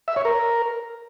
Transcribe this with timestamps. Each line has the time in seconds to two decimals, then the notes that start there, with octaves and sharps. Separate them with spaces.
0.08 E5
0.16 C#5
0.25 A#4